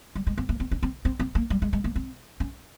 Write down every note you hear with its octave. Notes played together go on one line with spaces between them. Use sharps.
G3
G#3
C4
A#3
C4
C#4
C4
C4
C4
A#3
G3
G#3
G#3
A#3
C4
C#4